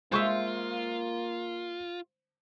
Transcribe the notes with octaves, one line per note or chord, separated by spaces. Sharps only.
G#3 A#3 F4 C5 E5 C#6